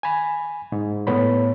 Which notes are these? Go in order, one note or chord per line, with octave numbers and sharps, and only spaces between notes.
G#5 B5
G#2
A2 B3 C#5 B5